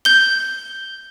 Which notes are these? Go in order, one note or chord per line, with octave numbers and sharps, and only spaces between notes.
G6 G7